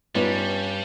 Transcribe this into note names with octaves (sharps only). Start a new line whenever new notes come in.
G2 G3 B3 C#4 D#4 F4